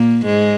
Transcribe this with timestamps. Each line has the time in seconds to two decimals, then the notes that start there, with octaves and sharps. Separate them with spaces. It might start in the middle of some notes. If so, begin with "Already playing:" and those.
Already playing: A#2 A#3
0.26 G#2 G#3